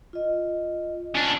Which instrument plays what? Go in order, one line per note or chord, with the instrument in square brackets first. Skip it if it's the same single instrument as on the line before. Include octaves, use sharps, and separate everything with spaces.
[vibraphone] F4 D#5
[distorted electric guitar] C#3 D4